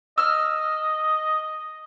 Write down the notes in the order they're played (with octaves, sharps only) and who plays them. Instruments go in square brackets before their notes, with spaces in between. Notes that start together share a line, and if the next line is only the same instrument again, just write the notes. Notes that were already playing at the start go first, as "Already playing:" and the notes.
[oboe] D#5 [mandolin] E6 F6